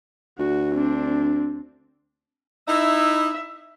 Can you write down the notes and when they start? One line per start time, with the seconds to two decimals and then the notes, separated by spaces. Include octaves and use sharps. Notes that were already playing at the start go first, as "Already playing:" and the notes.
0.39 D2 F#4
0.73 C4 D4
2.68 D#4 E4 E5